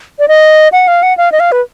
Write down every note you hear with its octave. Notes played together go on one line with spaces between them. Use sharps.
D5
D#5
F#5
F5
F#5
F5
D#5
F5
B4